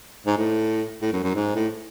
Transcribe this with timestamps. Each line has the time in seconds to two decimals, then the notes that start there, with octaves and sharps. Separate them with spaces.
0.26 G#2
0.37 A2
1.02 A2
1.13 F#2
1.23 F#2
1.35 G#2
1.55 A2